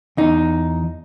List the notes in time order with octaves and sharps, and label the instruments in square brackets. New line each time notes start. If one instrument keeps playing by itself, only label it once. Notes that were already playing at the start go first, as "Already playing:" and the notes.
[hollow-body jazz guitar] E2 D#4